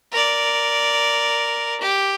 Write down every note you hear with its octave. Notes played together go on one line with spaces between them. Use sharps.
A#4 D5
G4